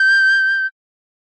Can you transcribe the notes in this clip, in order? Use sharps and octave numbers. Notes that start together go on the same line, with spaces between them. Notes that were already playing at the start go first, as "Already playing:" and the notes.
Already playing: G6